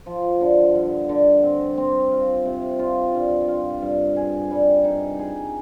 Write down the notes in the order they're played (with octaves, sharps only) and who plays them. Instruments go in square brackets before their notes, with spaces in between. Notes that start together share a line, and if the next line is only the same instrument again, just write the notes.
[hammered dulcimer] F3
D3
G2
D3
C4
C4
F4
C3
F4
G2
F4
G2
G#4
G3
D#4
G#4